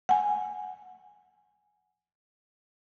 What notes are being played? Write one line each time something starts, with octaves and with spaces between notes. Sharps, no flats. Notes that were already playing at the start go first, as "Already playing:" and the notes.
F#5 G#5